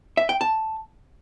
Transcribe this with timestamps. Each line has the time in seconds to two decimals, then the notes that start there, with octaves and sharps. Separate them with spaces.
0.17 E5
0.29 G5
0.41 A5